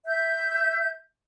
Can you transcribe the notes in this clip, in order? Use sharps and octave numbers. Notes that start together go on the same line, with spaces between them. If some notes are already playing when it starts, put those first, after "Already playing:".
E5 G6